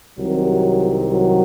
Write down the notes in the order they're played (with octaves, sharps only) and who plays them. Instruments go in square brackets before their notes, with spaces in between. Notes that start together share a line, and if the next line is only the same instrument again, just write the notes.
[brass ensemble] C2 C3 D#3 F#3
F#3